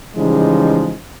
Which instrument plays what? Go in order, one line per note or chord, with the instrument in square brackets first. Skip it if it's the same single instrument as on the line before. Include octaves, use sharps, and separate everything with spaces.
[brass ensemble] C#3 E3 F3 G3 G#3 D#4